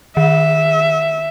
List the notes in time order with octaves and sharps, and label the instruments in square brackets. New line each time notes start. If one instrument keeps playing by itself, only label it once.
[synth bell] D#3 [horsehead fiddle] E5